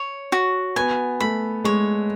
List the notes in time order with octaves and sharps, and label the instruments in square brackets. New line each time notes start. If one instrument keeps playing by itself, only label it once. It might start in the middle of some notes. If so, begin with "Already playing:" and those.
Already playing: [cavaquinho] C#5
F#4
[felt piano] B3 [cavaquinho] G#5
[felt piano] A3 [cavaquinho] B5
[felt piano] G#3 [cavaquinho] C#5